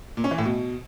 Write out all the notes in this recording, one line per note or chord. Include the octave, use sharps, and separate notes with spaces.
A#2
C#4
E3
A2
B2